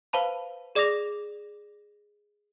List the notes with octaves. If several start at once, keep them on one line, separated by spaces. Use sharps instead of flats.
B4 C5 F5 A5 B5
G#4 D5 D6 D#6 A#6 F7